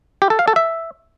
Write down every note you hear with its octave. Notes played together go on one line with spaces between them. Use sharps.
G4
A4
F5
A4
E5